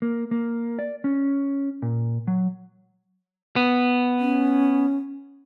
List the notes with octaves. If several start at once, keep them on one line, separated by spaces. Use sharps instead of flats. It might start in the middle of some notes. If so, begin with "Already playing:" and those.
A#3
A#3
D5
C#4
A#2
F#3
B3
C#4